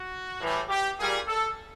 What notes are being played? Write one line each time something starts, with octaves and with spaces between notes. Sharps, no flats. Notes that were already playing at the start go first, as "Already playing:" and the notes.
Already playing: F#4
A2 E3 G3
G4
A#2 G3 G#4
A4